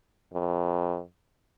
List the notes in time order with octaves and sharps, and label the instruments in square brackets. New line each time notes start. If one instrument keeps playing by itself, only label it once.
[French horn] F2